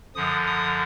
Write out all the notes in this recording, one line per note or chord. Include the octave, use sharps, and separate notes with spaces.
F#2 D3 F3 D#6
D#6